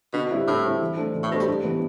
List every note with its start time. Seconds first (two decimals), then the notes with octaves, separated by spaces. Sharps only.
0.14 B2 D3
0.31 G3 C4 E4
0.47 A2 D3
0.65 G3 C4 E4
0.81 E3
0.97 A3 D4 A4 C5
1.15 E3
1.23 A2
1.31 B2 A3 D4 A4 C5
1.40 G3
1.48 G2
1.64 E3 B3